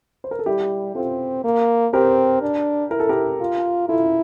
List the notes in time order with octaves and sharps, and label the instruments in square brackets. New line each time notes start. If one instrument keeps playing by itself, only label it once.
[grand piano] C5
A#4
A4
[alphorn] G3 [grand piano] E4 G4
[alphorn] C4 [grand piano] F4 A4
[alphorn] A#3
[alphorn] C4 [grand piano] G4 A#4
[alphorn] D4
[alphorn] E4 [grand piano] A#4
[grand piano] A4
G4 A#4
[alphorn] F4
[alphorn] E4 [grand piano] F4 A4